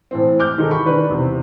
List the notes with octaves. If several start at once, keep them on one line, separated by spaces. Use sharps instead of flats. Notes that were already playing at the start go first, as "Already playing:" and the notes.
A2 E3 C4
D6 F6 G6
D#3 D#4 G#4 A4
B5 C#6
D#3 D4 B4
E2 C3